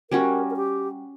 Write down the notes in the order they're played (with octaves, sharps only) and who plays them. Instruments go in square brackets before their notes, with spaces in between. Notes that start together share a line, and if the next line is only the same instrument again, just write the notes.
[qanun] G3 C#4 F#4 [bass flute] A#4
[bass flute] A#4
G4